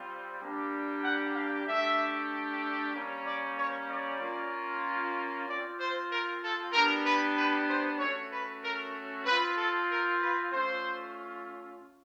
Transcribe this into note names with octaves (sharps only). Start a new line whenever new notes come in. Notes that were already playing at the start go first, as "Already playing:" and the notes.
Already playing: G3 C4 F4
G3 A#3 D4 G4
F#5
F5
A3 D4 G4 E5
G3 A#3 C#4
D5
C#5
D5
A#3 C#4 F4
C4 F4 D5
C5
A#4
A4
B3 D4 G4 A#4
B4
B4
C5
A3 C#4 F#4 C#5
B4
A#4
C4 F4 B4
A4
A#4
B4
A3 C#4 F4 C5